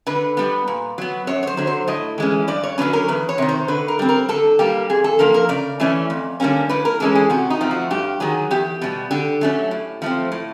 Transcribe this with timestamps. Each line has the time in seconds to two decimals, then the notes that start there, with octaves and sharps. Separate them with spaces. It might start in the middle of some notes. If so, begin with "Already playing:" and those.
0.07 D3 B4
0.37 G3 B3
0.68 A#2
0.98 F#3 B3
1.27 F#2 C#5
1.43 C#5
1.47 C5
1.57 D3 F#3
1.67 C5
1.88 A2 D#5
2.18 E3 G#3 C#4
2.48 G2 D5
2.63 C#5
2.78 D3 F#3 A#3 C#4 B4
2.93 A#4
3.08 E2 B4
3.29 C#5
3.38 C3 D#3
3.49 C5
3.68 D3 B4
3.88 A#4
3.99 G3 C4
4.09 A#4
4.29 D3 A4
4.59 G3 A#3 G4
4.90 F2 G#4
5.04 A4
5.19 D3 F3 A#3 A#4
5.34 A#4
5.49 C#3 D5
5.80 E3 A3 C#4
6.10 F2
6.40 D3 G3 A#3 C#4
6.69 A2 B4
6.85 A#4
7.00 E3 G#3 C#4 A4
7.15 G#4
7.30 C3 F#4
7.50 D#4
7.61 F3 A3 C4
7.71 F#4
7.91 G2 G4
8.20 D#3 F#3 G#4
8.51 E2 G4
8.82 B2 G3
9.11 D3 G4
9.41 F#3 A3 C#4
9.71 A2
10.02 F3 A3 C4
10.32 A2